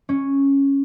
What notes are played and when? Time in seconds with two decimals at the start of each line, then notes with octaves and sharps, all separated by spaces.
0.09 C#4